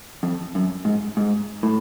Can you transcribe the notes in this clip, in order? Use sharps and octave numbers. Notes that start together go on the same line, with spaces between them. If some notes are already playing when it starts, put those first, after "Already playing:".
F2
F#2
G#2
G#2
A2